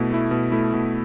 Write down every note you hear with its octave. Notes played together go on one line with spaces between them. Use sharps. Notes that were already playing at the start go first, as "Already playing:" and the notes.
Already playing: B2 A3 E4
A3 E4
B2
A3 E4
B2